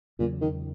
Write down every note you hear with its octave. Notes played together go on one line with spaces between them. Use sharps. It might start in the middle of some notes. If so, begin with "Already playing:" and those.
E2 A#2 C#3 F#3
D#3